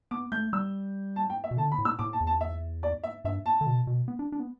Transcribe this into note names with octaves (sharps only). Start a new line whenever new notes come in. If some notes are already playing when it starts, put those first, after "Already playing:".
B3 D6
A3 G6
G3 E6
A5
G5
E5
B2
D3 A5
B5
A2
E6
A2 D6
A5
E2
A5
E5
D5
E5
G2 E5
A5
D3
B2
B2
B3
D4
D4
B3